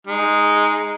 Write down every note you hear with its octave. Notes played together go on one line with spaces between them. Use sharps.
G#3 D#4